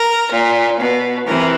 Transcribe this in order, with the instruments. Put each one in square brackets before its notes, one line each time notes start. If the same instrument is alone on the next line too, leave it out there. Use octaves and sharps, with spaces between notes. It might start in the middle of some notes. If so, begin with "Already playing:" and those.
Already playing: [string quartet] A#4
A#2
B2
C3 E3 A#4